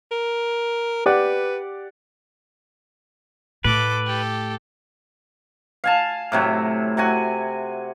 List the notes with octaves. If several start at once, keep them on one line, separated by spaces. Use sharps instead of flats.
A#4
G4 B4 D5 F#5
A2 A4 B4 D6
G4 A4
F5 G#5 A5
A2 C3 F#3
C3 F#4 G#5